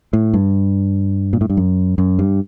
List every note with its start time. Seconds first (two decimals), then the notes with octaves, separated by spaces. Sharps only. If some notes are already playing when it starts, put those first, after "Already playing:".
0.13 A2
0.34 G2
1.33 A#2
1.41 A2
1.50 G2
1.57 F#2
1.98 F#2
2.19 G2